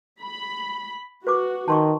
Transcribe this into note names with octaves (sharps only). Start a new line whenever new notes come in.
B5
F#4 B4 C#6 D6
D#3 A5 C6 C#6